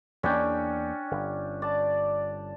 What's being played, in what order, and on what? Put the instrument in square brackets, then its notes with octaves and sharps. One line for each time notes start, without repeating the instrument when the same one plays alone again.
[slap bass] E2 A#3 [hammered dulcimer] C#4 D4 G5
[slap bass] G1
[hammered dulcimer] D5 A5